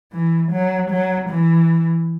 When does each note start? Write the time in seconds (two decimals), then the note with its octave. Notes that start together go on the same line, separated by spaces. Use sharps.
0.12 E3
0.52 F#3
0.90 F#3
1.29 E3